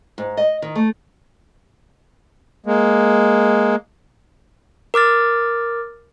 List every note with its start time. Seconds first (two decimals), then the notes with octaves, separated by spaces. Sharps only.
0.18 G#2
0.37 D#5
0.62 D#3
0.75 A3
2.66 G#3 A#3
4.94 A#4 D6 F6 A6